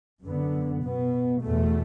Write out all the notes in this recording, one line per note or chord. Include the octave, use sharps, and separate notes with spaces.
F#2 D3 B3
B2 B3
E2 B2 A3